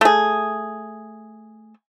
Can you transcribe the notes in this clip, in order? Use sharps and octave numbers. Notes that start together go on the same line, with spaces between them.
A3 G#4